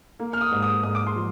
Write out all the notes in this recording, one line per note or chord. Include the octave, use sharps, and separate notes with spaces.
A#3
F6
D#6
G#2
D#6
G#2 D#6
D6
C6
F3